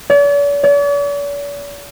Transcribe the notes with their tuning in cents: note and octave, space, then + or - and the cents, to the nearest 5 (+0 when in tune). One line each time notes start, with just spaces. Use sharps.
D5 -45
D5 -45